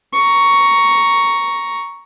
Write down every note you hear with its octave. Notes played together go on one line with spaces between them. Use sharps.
A#5 C#6